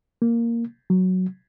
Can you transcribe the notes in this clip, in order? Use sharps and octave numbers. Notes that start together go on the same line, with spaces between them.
A#3
F#3